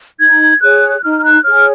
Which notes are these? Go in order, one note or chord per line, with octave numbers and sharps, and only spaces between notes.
D#4 G#6
G#4 C#5 F#6
D#4 F6
F#6
G#4 C#5 F6